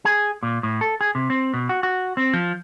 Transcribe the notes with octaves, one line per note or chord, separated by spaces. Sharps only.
G#4
A#2
A2
A4
G#4
C3
C4
B2
F#4
F#4
C4
F3